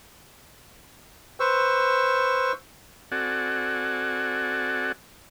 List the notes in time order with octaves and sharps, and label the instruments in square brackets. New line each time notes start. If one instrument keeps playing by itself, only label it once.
[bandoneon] B4 C5 C#6 E6
[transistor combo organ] C4 F#4 A4 D5 F#5 G#5